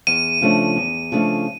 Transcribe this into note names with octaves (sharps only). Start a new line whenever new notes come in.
E2 D#7
C#3 F3 A3 D4
E2
C#3 F3 A3 D4